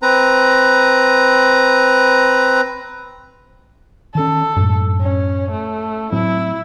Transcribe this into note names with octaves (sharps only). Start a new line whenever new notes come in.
C4 B4 A#5
D#3 C#4 A4
F#2 A2
C#4
A3
A2 F#3 C4 E4